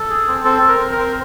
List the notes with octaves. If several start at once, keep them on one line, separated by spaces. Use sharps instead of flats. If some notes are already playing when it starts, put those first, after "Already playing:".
Already playing: A4
G#4
C4
C4 A4
C4
A#4
C4
A#4
C4